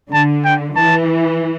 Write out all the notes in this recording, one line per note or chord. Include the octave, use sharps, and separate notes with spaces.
D3 A5
G5
E3 A5